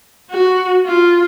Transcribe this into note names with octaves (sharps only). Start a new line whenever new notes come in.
F#4
F4